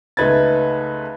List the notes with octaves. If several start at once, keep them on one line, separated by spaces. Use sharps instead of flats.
C#2 A3 D#4 B4 G#6 A6